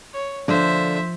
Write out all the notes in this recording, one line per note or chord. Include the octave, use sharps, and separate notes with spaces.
C#5
D3 F3 A#3 D4 C5 E5